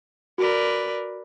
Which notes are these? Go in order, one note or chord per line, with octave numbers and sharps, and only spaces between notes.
F#4 A#4 B4 D5